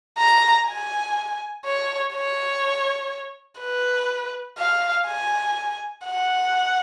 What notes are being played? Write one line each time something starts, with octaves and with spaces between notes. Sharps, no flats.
A#5
G#5
C#5
C#5
B4
F5
G#5
F#5